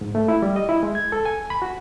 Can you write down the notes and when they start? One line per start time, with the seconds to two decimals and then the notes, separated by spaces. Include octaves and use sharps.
0.01 G#2
0.15 A3
0.28 E4
0.42 G3
0.56 D#5
0.69 E4
0.83 G#3
0.95 G#6
1.12 A4
1.25 G#5
1.50 B5
1.62 F#4